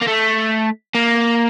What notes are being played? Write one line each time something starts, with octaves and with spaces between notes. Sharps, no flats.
A#3
A3
A#3